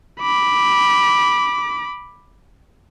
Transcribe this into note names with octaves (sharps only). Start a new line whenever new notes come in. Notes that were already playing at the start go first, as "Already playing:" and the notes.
B5 D6